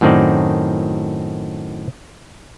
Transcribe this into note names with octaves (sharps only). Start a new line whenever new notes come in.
F#2 A2 D#3 C4 D#4 D5